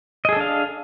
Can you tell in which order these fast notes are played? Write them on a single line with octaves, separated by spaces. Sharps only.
D#5 G#4 A4 D4 F5